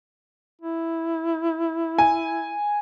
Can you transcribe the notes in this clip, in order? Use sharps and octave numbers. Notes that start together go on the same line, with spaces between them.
E4
G#5